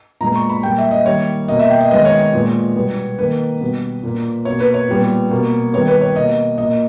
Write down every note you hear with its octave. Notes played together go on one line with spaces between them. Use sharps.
A#2 G#3 B3 A#5
C#6
B5
A#2 G3 A#3 G5
E5
D#5
D#3 G3 A#3 C#5
B2 A#3 D#5
E5
G5
D#5
D#3 G#3 B3 D#5
C#5
C#5
A#2 G#3 B3
B2 G3 B3
D#3 A#3 B4
B2 G3 B3
A#2 A#3
B2 A#3 C#5
B4
C#5
A#2 G3 B3
B2 A#3
D#3 G3 B3 C#5
B4
C#5
B2 A#3 D#5
A#2 A#3 D#5